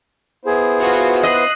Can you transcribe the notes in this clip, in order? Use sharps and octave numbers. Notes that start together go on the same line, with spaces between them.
B3 E4 G#4 C5
F4 F#4 B4
D#5 F#6 C7